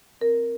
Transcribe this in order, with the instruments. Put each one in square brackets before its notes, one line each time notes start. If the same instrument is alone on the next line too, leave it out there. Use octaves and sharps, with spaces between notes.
[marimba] C4 A#4